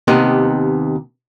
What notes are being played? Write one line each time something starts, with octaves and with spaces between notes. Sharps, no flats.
D#2 C3 B3 D#4